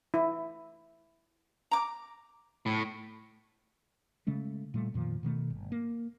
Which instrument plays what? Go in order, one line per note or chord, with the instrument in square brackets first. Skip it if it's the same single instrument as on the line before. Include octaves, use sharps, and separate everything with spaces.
[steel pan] E4
[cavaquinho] A#5 D6
[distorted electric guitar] A2
[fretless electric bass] C#3 G#3 A3 C#4
A#2 G3 A3
F2 A#2 D#3 F3
B2 D#3 G3 A3
G1
A#3